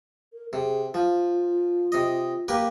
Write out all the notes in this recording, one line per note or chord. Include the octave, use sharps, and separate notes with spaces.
A#4
C3 G#4
F3 F4
C3 D#5
A#3 G4 B4